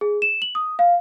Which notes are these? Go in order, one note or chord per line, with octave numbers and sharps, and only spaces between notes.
G#4
E7
F#7
D#6
F5